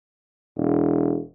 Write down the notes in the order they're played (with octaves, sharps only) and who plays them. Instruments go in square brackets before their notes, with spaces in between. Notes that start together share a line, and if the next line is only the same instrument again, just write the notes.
[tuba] E1